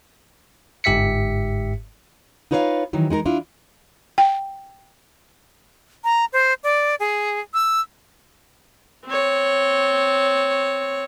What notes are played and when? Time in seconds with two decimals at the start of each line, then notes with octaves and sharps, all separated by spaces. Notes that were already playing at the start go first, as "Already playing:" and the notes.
0.84 G1 G#2 G4 E5 B6 C#7
2.51 D#4 F4 B4 C#5 D#5 F5
2.93 D#3 E3 F#3
3.10 G#3 D#4 G#4 A#4
3.25 D4 E4 F4
4.18 G5
6.04 A#5
6.33 C5
6.64 D5
7.00 G#4
7.54 E6
9.06 C4 C#5